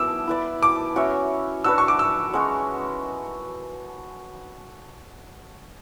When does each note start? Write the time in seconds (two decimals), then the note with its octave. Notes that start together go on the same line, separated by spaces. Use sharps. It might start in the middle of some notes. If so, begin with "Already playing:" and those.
Already playing: B3 E4 B4 D6 E6
0.27 E4 B4 D5
0.63 D6
0.96 C#4 F#4 C#5 E5
1.64 D4 F#4 B4 E6
1.78 C#6
1.88 D6
1.99 E6
2.33 G#3 C#4 F#4 C#5